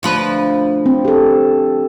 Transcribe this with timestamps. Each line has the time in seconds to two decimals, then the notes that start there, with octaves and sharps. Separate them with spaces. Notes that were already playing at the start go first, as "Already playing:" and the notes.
0.03 D2 F3 B4
0.86 C4
1.05 G4 A4